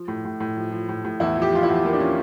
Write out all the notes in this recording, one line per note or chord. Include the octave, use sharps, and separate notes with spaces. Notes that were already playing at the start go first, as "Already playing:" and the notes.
Already playing: F3
A2
A2
A2
F3
F3
A2
A2
E2 E4
F3
G4
F3 F4
E4
E2
F3 A#3
D4
F3 C#4